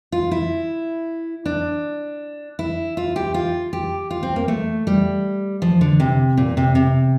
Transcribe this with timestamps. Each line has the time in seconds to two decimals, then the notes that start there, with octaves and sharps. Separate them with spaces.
0.12 F4
0.31 E4
1.46 D4
2.59 E4
2.97 F4
3.16 G4
3.34 F4
3.73 G4
4.11 F4
4.23 C4
4.36 A#3
4.48 A3
4.87 G3
5.62 F3
5.81 D3
6.00 C3
6.37 A#2
6.57 C3
6.75 C3